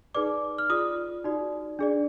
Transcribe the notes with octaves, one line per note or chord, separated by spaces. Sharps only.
D#4 G#4 B4 D5 D6
F6
F4 G#4 D5 D#6
D#4 F#4 D5
D4 G#4 D5